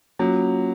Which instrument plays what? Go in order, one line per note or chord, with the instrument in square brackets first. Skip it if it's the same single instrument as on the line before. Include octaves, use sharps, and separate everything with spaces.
[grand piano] F#3 [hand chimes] A#3 C#4 F4